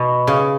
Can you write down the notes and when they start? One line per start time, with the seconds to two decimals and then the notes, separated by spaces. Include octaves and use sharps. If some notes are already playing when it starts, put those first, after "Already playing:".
Already playing: B2
0.27 C#3